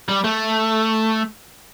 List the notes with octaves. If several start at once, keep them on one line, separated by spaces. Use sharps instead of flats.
G3
A3